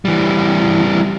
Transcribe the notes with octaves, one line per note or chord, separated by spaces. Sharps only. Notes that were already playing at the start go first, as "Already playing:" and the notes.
E3 G3